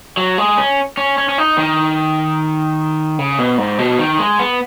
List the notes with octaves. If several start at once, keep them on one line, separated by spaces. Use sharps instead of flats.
F#3
G#3
C#4
C#4
C#4
C#4
D#4
D#3
C#3
B2
G#2
B2
D#3
G#3
B3